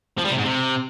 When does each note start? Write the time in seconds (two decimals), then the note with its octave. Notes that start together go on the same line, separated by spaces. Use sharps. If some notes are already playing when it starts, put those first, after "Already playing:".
0.18 F3
0.25 G3
0.31 C3
0.38 G#2
0.44 C3